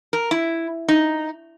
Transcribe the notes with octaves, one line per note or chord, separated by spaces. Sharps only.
A#4
E4
D#4